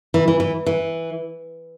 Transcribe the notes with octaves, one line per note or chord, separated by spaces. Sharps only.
E3
E3
E3
E3